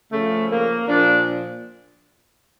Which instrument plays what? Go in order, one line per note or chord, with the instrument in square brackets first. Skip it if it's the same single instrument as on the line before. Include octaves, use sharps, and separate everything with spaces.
[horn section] C#3 F3 A3
A#3
A#2 F3 D4